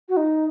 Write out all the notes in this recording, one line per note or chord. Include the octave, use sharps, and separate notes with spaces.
F#4
D#4